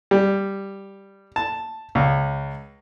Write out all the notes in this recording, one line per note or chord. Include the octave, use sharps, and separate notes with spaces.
G3
A5
C#2